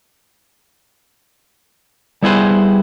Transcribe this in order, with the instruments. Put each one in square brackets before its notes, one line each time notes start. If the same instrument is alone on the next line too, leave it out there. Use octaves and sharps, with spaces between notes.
[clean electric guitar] G3 B3 E4 G#4 B4 C5